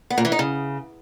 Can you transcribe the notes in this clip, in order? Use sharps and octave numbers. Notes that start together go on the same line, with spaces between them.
B3
A#2
E3
D#4
C#3